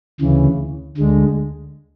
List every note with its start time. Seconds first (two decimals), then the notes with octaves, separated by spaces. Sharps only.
0.21 D2 C#3 E3
0.97 D2 D3 G#3